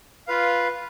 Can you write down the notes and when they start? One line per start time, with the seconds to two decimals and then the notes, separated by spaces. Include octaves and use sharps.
0.27 F4 B4 F5